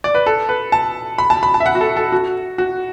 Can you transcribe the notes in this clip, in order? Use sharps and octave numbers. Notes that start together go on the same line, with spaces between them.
D5
B4
A4
B4
A5
B5
A5
B5
A5
E5
F#5
F#4
A4
A4
F#4
F#4